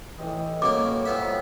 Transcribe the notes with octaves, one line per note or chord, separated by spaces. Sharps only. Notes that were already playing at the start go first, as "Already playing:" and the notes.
A2 E3 G4 D#5
B2 F#3 A#3 C#5 D6
F3 G3 A#3 B3 E5